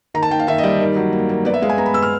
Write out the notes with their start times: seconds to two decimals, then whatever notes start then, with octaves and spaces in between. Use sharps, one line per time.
0.14 D#3 A#5
0.23 A5
0.31 D#3 G5
0.39 F5
0.47 D#3 E5
0.58 D#5
0.63 G3 D5
0.81 D#3
0.96 F#3
1.13 A#3
1.29 A#3
1.45 B3 D5
1.54 E5
1.62 G#3 F5
1.70 G#5
1.78 B3 A#5
1.86 B5
1.94 B3 E6
2.02 F6